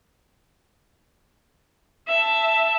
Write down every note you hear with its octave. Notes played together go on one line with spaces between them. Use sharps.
E5 A5